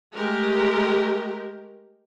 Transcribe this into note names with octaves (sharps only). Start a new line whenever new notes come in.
G#3 A3 G4 A#4